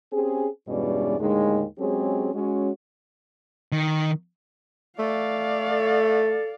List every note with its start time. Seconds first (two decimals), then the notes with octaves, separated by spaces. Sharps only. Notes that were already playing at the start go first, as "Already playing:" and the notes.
0.12 C4 C#4 G4 G#4
0.68 E2 G2 B2 G#3 C#4 D5
1.19 D#2 A2 D3 D#3 G#3
1.78 F#3 G#3 C4 C#4 G4 G#4
2.33 G#3 C#4 F#4
3.72 D#3
4.99 A3 D5 F5
5.70 A4